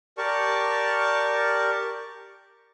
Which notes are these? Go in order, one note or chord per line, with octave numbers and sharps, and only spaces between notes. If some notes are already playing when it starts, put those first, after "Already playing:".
G4 A#4 D5 A5 C#6